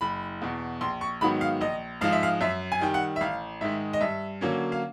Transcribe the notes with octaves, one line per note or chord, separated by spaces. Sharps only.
F#1 B5
E2 B2
A#1 C6
C#6
G#2 D#3 F#3 B3 B5
F5
A#1 D#5
G#2 F3 G#3 F5
E5
F5
F#2 E5
G#5
D#3 G3 G5
F#5
E5
A1 F5
G#2 D#3 G#3 E5
D#5
G2 E5
D3 F#3 A#3 C#4
F5